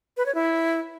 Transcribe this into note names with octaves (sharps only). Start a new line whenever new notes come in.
B4
C#5
E4